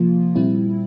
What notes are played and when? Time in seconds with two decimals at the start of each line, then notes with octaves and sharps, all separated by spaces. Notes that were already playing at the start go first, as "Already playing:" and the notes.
Already playing: C3 F3 A#3 F4
0.36 A#2 G3 C4 E4